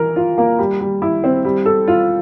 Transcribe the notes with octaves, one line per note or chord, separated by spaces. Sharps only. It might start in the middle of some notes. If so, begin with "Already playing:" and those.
Already playing: E3 A#4
F4
A#3
G3
G3
E4
C4
G3
A4
F4